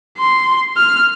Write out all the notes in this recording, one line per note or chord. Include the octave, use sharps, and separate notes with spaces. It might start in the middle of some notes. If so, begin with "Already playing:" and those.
C6
F6